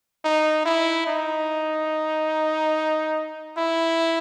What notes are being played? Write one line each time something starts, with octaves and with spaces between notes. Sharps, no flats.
D#4
E4
D#4
E4